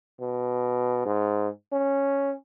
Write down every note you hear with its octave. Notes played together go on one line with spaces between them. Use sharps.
B2
G#2
C#4